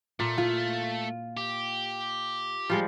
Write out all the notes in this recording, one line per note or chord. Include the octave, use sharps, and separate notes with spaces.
A#2 A3
F4
G4
F3 G3 G#3